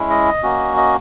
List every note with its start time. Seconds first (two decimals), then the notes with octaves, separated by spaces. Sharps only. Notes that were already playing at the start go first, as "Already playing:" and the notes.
Already playing: G#3 C#4 E4
0.10 D#5
0.43 A#3 C#4 F#4
0.77 D#5